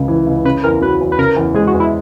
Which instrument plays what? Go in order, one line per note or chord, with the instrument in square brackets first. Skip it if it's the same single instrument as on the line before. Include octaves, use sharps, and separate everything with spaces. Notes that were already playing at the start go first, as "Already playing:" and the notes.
Already playing: [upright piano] C#2 C#3
E3
C#2
[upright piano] C#3 [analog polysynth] B4
[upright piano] E2 [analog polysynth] A#4
[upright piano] F#3 [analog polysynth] B4
[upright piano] E2
[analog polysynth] B4
[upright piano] C#3 [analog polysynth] A#4
[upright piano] E2
[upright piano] G#3 [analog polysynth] G#4
[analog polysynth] F#4
[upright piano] E2
[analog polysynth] E4